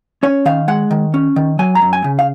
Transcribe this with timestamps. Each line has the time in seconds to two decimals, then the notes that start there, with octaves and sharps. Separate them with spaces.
0.23 C#4 C#5
0.46 D#3 F5
0.68 G#3 F#5
0.91 D#3
1.14 C#4
1.36 D#3
1.59 F#3 G#5
1.75 A#5
1.82 F#2
1.93 G#5
2.04 C#3
2.19 F5